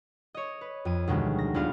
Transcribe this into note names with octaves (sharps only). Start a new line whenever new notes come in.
C#5 D#5
B4
F2 D#7
D2 B2 D#3 G3 G#3
A#6
D#1 G3 B3 D4 F4 F5